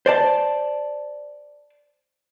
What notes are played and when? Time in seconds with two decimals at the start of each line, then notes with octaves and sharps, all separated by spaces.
0.06 C5 D5 A5